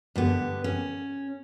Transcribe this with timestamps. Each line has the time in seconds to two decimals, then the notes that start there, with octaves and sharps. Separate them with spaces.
0.16 G2 D3 B3
0.64 C#4